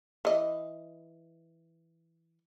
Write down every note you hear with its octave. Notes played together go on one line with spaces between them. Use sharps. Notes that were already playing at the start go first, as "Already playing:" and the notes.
E3 D#5